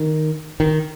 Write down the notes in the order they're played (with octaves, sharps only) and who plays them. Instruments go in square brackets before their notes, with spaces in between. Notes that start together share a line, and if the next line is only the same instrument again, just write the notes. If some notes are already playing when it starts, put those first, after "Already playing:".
Already playing: [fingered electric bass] D#3
D#3